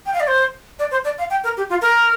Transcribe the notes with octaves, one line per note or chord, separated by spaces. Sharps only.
G5
F5
D5
C5
D5
C5
D5
F5
G5
A#4
G4
F4
A#4